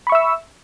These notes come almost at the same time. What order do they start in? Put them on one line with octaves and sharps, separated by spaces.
B5 C#6 E5 E6